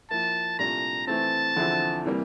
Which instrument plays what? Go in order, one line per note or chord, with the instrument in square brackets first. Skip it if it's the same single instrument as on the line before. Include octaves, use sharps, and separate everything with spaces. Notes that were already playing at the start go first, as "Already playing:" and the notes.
[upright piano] F3 A#3 E4 [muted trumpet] A5
[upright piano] C2 A#2 A3 D4 F4 [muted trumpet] A#5
[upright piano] E3 A3 C4 [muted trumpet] A5
[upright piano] E2 D3 F3 C4 E4
C3 E3 G3 A#3